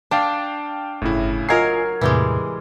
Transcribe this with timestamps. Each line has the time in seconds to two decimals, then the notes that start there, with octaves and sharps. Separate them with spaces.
0.11 D4 F5 G5 A5
1.02 G1 A2 C#3 E4
1.49 F#3 F4 A#4 D#5 G#5 F6 G#6 C7
2.01 E2 A2 C3 E3 G3 G#3